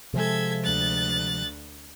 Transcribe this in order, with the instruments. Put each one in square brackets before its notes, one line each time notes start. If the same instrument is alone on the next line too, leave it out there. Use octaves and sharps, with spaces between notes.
[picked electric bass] C3 F3 G#3 [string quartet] A4 E5 G#6
[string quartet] D2 F#6 A6